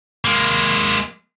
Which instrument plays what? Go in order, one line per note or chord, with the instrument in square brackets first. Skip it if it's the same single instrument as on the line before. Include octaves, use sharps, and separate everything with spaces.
[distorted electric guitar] G#3 A#3